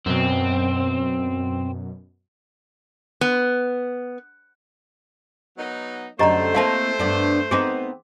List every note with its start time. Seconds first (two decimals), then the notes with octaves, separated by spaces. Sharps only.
0.06 F#2 B2 C4
3.21 B3
5.57 F#3 B3 D#4
6.19 F#2 D3 A3 G4 C5 D#5 A#5
6.55 A#3 C4 E4 F5 A5
6.99 G2 B3 D4
7.51 B3 C4 D#4 G#4 C6